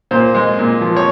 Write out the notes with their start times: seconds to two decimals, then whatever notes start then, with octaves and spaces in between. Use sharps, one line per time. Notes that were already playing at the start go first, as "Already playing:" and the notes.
0.11 A#2 C5
0.35 G#3
0.59 A#2
0.81 F3
0.96 C#5